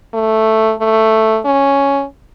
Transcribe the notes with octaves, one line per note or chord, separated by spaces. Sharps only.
A3
A3
C#4